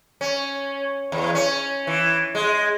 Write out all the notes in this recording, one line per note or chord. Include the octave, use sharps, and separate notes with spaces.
C#4
E2
C#4
E3
G#3